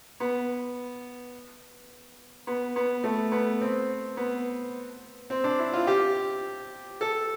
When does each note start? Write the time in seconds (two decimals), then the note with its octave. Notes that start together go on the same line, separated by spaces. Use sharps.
0.20 B3
2.47 B3
2.76 B3
3.04 A3
3.32 B3
3.61 C4
4.17 B3
5.30 C4
5.44 D4
5.59 E4
5.73 F4
5.87 G4
7.01 A4